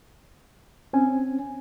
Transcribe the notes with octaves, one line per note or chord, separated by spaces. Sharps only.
C4 C#4 G#5